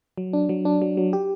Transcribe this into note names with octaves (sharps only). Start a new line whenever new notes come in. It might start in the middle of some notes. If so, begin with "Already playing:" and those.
F#3
D4
F#3
D4
F#3
F#3
G4